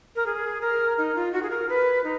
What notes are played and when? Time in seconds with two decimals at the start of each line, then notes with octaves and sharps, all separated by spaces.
0.15 A#4
0.26 G#4
0.61 A#4
0.97 D#4
1.15 F4
1.32 F#4
1.42 G#4
1.50 A#4
1.68 B4
2.03 D#4